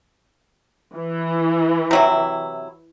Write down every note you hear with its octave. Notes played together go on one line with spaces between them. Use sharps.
E3
C3 F#3 E4